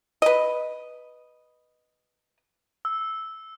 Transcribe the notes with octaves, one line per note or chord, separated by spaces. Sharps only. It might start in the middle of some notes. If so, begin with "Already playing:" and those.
B4 D#5
E6